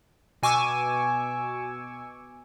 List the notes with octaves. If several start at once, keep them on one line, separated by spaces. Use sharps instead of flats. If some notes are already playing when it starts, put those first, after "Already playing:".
B2 G#5 C#6 D6 E6